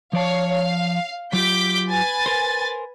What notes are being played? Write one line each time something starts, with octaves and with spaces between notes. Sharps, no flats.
F3 C#5 D5 F5 A5
F5
F#3 F4 G4 D6 G6 B6
B4 G#5 A6
A#4 C5